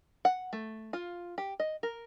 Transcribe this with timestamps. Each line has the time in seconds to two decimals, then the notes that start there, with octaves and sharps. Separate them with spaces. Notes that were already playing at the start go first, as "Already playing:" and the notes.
0.25 F#5
0.53 A3
0.93 F4
1.38 G4
1.60 D#5
1.83 A#4